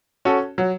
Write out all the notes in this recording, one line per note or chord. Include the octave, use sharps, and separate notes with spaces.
C#4 F#4 A4
F#3